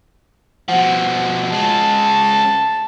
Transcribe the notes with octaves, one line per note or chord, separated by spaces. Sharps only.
B2 F3 F#5
G#3 C#4 A5